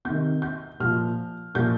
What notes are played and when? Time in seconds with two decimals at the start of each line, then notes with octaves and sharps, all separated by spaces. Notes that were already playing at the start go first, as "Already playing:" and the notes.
0.05 C3 D#3 G6
0.42 G6
0.80 A#2 F3 F6
1.55 A#2 F3 G6